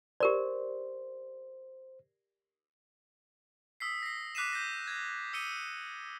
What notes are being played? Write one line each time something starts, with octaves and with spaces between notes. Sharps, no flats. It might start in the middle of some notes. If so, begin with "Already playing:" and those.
G4 A#4 C5 D5
D#6 E6 B6 C7
A#6 C7
D6 F#6 B6 C7 D#7 E7
G6 A#6
G#6 A#6
D#6 E6 C#7 D#7 G7